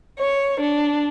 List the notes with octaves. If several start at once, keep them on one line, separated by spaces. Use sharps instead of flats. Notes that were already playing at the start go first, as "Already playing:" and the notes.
C#5
D4